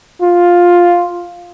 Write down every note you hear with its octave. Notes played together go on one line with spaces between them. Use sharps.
F4